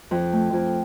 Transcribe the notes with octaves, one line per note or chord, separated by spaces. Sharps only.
F2
A3
F2